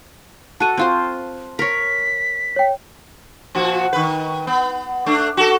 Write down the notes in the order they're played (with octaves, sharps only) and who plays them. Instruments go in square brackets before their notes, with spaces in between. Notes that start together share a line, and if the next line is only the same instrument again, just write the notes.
[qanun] F#4 A4 [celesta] A5 F#6 D#7
[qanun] C4 F4 C5
[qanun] A#4 C#5 [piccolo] B6
[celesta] C#5 G5
[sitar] A#2 F3 F#4
D#3 B4
B3
A3 D4
F#4 A4